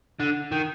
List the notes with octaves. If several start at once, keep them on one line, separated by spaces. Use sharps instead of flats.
D3
D#3